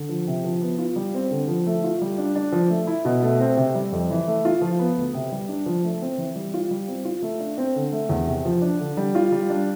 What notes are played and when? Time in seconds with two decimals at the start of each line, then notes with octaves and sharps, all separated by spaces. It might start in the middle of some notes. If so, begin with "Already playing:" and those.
Already playing: D3
0.09 F3
0.27 C3
0.44 F3
0.62 B3
0.78 F4
0.96 G3
1.14 C4
1.31 D3
1.48 F3
1.67 A3
1.84 F4
2.01 G3
2.18 D4
2.35 D4
2.52 F3
2.70 A3
2.87 E4
3.05 B2
3.22 A3
3.40 C4
3.57 C3
3.75 G3
3.92 F2
4.10 E3
4.28 A3
4.45 F4
4.61 F3
4.79 B3
4.97 D2
5.14 C3
5.32 G3
5.48 D4
5.66 F3
5.84 A3
6.02 C4
6.18 E3
6.36 G3
6.54 F4
6.71 G3
6.88 C4
7.05 F4
7.22 A3
7.40 D4
7.58 C4
7.76 D3
7.92 A3
8.09 E2
8.27 C3
8.45 F3
8.62 D4
8.79 D3
8.97 G3
9.15 F4
9.32 G3
9.50 D4